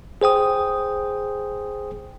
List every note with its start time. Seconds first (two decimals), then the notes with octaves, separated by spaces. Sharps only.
0.21 G#4 C5 G5 D#6